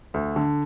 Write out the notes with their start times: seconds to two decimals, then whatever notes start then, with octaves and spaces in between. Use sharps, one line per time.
0.14 D2
0.36 D3